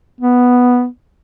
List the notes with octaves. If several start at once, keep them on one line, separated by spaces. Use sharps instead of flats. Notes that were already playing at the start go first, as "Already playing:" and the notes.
B3